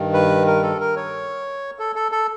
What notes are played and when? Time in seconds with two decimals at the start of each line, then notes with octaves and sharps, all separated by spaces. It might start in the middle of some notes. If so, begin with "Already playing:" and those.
Already playing: G2 D#3
0.14 B4
0.47 A#4
0.63 A4
0.80 A#4
0.96 C#5
1.79 A4
1.96 A4
2.12 A4